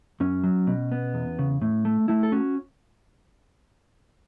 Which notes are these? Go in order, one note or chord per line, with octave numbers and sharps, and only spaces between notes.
F#2 C#4
F#3
B2
B3
E2
C#3
A2
A3
A3 E4
A4
C#4 F#4